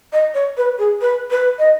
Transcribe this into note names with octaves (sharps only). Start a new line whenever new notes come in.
D#5
C#5
B4
G#4
B4
B4
D#5